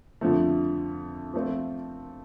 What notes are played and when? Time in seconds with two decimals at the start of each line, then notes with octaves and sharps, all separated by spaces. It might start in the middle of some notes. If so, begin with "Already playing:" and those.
0.21 F2 D3 F3 A3
1.34 F3 A3 C4 F4